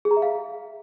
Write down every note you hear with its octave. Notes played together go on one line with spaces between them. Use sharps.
G#4
A#5
E5
F5